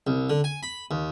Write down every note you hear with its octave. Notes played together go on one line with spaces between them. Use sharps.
C2
D3
G#5
B5
D#2